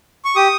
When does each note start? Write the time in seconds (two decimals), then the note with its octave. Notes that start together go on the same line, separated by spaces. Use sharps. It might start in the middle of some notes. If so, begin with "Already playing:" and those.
0.25 C#6
0.36 G4 D#6